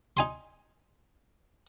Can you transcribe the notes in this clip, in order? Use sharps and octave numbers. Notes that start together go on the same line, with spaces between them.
D#4 G#5 C6